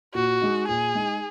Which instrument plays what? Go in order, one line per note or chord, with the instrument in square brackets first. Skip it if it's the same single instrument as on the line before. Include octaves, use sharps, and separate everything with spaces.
[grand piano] A#2 [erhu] F#4
[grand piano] G#3 D#4
[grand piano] A#2 [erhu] G#4
[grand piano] G#3 D#4